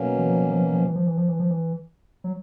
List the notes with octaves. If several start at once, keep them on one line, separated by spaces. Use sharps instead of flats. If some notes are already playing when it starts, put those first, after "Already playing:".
Already playing: B2 F#3 A#3 C#4
E3
F3
E3
F3
E3
F3
E3
F3
E3
F3
E3
F3
E3
F#3